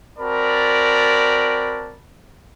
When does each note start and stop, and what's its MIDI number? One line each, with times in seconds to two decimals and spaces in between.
0.19 1.96 60
0.19 1.96 66
0.19 1.96 70
0.19 1.96 74
0.19 1.96 81
0.19 1.96 83